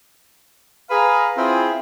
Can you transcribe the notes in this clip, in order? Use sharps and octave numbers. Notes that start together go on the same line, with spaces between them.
G#4 B4 F5 A#5
C4 E4 F4 G#4